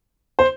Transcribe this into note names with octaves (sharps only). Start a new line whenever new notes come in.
C5